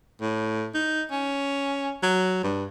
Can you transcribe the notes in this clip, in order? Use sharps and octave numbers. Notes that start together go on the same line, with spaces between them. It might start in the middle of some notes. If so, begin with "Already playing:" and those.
A2
D#4
C#4
F#3
G2